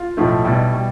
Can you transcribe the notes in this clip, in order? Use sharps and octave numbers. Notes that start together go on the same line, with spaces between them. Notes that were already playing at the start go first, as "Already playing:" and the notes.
Already playing: F4
B1 A2 F3 A3
B1 B2 G3 E4
B2 G3